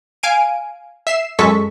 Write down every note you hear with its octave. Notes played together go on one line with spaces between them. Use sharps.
F5 G#5 D7 D#7
E5 C7 E7
F#2 G#3 A4 C#6 B6